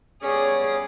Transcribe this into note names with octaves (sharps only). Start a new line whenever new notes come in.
G3 B3 C#4 G#4 C#5 D5